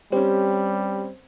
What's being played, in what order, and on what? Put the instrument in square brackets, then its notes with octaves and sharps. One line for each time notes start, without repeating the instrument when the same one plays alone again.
[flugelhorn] G3 [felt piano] C4 C#4 [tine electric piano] G4